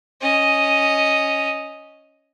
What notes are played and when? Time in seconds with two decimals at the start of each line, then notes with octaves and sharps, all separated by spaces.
0.21 C#4 D#5